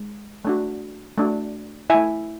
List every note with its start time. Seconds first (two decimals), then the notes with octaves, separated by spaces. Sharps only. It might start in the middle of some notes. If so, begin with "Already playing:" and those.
Already playing: G#3
0.45 A3 D4 F#4
1.18 A3 D4 F#4
1.90 A3 E4 E5 G#5